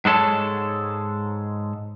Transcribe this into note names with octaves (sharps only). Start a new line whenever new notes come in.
G#2 G#3 A4 C#5 A5